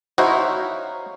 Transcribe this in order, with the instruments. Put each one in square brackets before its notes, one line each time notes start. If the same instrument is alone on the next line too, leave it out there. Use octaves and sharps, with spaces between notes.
[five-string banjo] D#4 E4 [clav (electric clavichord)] F#4 C5 [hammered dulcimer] C#5 F5 A#5